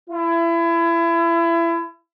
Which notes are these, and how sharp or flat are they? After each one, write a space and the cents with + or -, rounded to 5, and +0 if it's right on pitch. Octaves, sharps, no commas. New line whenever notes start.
E4 +30